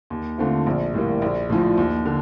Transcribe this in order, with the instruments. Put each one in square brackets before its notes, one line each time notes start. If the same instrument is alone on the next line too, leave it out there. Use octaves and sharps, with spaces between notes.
[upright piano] D#2
D3 A3 C4 F4
A#1
A2 G3 A#3
A#1
A2 F3
D#2
D3